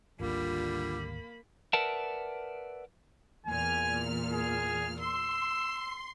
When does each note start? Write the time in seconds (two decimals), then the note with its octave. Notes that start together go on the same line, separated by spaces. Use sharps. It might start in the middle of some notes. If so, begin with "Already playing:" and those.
0.20 G#1 D2 D3 D#3 G3 A#3 F4 B5
1.73 A#4 B4 D5 E5 F#5 A5
3.46 E2 A#2 G#5 F6
4.32 G#4
4.99 C6 E6